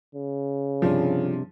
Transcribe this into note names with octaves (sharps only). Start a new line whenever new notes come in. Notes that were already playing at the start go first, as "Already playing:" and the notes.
C#3
G2 C3 F3 D4